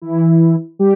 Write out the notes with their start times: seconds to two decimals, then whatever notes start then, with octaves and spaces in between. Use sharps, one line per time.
0.02 E3 E4
0.79 G3 G4